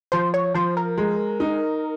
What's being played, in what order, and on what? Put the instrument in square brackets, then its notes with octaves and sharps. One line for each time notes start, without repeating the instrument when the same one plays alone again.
[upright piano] F3 [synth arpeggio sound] C5
[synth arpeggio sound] C#5
[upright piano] F3 [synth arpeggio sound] C5
[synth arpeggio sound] A#4
[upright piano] G#3
D#4